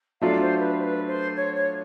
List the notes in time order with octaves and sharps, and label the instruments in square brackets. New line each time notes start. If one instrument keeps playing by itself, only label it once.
[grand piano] F#3 A3 D4 F4 [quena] F5
[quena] C5
B4
C5
B4
C5
C#5
C#5